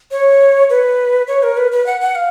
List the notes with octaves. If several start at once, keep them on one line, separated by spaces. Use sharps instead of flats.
C#5
B4
C#5
A#4
B4
B4
F#5
F#5
F5